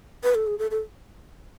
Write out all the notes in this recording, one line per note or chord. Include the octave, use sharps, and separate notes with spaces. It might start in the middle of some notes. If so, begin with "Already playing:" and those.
B4
A4
G#4
A4
A4